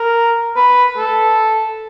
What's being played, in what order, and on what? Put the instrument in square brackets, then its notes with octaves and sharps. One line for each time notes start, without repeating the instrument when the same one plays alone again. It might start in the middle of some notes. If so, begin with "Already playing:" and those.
Already playing: [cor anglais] A#4
B4
A4